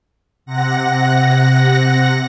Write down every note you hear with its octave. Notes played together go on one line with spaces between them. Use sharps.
C3 F#5 A#6